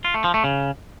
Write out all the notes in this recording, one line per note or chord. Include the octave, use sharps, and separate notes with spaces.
F4
A3
F3
A3
C#3